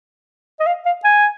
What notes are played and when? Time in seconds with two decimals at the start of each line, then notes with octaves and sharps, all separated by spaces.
0.60 D#5
0.67 F5
0.86 F5
1.04 G#5